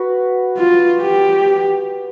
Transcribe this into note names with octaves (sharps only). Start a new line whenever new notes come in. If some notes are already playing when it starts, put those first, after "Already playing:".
Already playing: F#4 B4
F4
G4